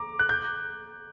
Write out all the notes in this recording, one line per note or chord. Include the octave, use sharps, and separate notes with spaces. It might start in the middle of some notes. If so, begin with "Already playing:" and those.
Already playing: A#5 D6
F#6
G6